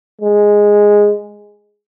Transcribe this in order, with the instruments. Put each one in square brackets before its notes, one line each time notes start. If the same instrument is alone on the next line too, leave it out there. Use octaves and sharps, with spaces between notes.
[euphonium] G#3